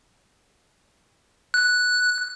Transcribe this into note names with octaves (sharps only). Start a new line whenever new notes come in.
F#6